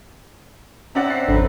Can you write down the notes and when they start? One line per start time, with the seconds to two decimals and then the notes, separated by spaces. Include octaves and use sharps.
0.95 C4 C#4 D5 E5 F#5 A#5
1.10 F#5 C7
1.28 G#1 F2 D3 B4